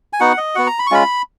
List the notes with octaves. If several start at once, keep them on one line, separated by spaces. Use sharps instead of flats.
G#5
B3 D#4 F#4 F#5
D#5
B3 F#4 F#5
A#5
B5
C#6
G#3 C#4 F4 B5